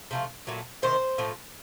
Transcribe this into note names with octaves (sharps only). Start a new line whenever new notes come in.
C3 F3 A3
A#2 F#3 A3
C3 D#3 C5
A2 F3 A3